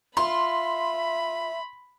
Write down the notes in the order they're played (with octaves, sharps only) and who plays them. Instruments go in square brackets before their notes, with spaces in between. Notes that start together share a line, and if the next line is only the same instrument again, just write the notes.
[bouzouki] F4 [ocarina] E5 [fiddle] B5 [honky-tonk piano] C6